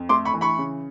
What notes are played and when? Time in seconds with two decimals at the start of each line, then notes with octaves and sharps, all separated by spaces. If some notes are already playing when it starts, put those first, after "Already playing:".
Already playing: F2
0.09 A3 C6 D6
0.25 B5 C#6
0.34 E3
0.41 B5 C#6
0.58 C#3